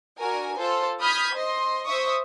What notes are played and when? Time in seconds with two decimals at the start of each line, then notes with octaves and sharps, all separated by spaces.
0.18 D4 F#4 A#4 G#5
0.56 F4 A4 C5
1.01 B5 D#6 F6 G6 G#6 B6
1.34 C5 D#5 C6
1.86 C5 E5 C#6 D#6